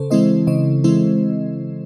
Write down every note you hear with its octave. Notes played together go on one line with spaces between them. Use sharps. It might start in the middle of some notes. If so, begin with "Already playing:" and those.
Already playing: C#3 A4 C5
E3 G#3 C4 E4 C5 D#5
C#3 C5 D#5
E3 G#3 C4 E4 C5